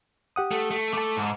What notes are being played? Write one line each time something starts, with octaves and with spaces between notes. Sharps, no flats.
G4 F#5 D#6
A3
A3
A3 A5 D6
G#2